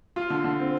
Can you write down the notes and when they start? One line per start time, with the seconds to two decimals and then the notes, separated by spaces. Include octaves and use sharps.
0.16 F4
0.30 D3
0.44 D3
0.59 C4